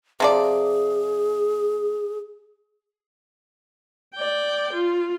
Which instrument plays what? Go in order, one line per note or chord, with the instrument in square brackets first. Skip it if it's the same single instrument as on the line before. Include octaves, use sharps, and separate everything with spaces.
[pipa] C3 F3 D5 [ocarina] G#4
[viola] D5 G5
F4